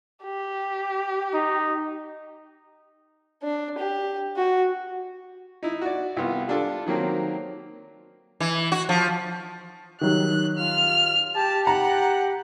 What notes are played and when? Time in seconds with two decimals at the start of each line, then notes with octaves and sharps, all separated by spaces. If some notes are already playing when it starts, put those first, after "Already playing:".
0.23 G4
1.34 D#4
3.42 D4
3.78 G4
4.37 F#4
5.63 D#4 E4
5.82 F#4 D5
6.17 C2 B3 F4
6.48 G3 D4 F4 A4
6.86 D#3 F#3 A#3 C4
8.40 E3
8.72 F#4
8.89 F3
10.01 D#3 F#3 G3 F#6
10.58 F4 F6
11.36 G4 A5
11.67 F#5 A#5